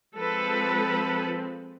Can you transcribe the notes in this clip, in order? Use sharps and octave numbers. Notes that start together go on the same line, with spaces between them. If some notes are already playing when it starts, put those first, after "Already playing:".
F3 G#3 C4 A4 B4